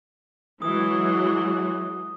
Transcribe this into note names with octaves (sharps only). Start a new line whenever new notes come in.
E3 F#3 G#3 D#6